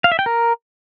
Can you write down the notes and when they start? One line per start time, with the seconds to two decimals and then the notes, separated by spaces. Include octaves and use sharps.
0.04 F5
0.12 E5
0.19 G5
0.26 A#4